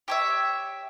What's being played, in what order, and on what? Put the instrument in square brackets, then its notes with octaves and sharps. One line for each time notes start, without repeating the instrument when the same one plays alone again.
[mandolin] G4 C#5 E5